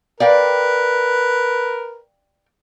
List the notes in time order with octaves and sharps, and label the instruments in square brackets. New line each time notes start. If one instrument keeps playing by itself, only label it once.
[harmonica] A#4 B4 [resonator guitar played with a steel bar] D5 F5 G5